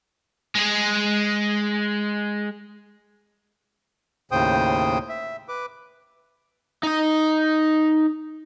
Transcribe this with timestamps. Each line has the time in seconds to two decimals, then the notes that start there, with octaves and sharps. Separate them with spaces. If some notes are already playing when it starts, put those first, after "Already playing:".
0.55 G#3 G#4
4.32 D#2 A2 C#3 C5 G5 D#6
5.09 E5
5.49 B4 D6
6.83 D#4 D#5